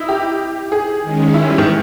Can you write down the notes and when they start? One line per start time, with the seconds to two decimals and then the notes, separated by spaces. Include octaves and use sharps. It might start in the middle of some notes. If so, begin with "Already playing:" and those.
Already playing: D#4 E4
0.09 G4
0.72 G#4
1.03 D#3 G#3 C#4
1.34 E4
1.50 G3
1.58 D#3
1.66 E3